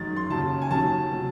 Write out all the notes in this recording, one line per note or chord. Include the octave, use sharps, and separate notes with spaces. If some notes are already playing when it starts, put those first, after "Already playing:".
Already playing: F#2 D#3 G#3 A6
C6
D#2 C#3 F#3 A5
G#5
D#2 D#3 F#3 A5
C3 F#3